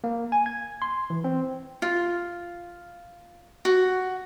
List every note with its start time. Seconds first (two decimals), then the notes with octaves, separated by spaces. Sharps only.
0.04 A#3
0.32 G#5
0.46 G#6
0.82 C6
1.10 E3
1.24 C4
1.82 F4
3.65 F#4